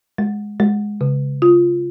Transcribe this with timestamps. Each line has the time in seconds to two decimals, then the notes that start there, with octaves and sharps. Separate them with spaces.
0.18 G#3
0.60 G#3
1.01 C#3
1.42 F4